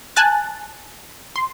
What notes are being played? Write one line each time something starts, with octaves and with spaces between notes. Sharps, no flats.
G#5 A5 F#6 A6
C6